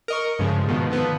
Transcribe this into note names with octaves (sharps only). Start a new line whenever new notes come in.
A#4 D#5 C#6
G2 C#3 F3 G#3
G#2 B2 D#3 F3
D3 F3 B3